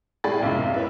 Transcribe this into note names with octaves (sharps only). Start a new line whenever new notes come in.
A2 G3 G#4 G5 B5 A6
B1 F#2 C3 F3 G#3
E4 B4 C#5